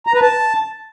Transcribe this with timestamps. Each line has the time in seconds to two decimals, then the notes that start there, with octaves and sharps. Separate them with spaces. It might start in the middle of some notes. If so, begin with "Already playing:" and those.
0.07 A#5
0.14 B4
0.22 A5